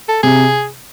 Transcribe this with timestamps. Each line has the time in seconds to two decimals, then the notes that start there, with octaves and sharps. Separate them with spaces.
0.09 A4
0.23 C3 G#4